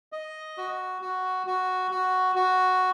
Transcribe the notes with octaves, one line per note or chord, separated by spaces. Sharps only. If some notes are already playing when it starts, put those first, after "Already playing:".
D#5
F#4
F#4
F#4
F#4
F#4